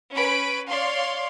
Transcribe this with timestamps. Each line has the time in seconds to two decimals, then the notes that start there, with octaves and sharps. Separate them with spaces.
0.15 C#4 B4 B5 D7
0.68 C#5 D5 F5 C6